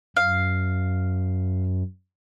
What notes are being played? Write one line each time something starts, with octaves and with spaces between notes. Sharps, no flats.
F#2 F5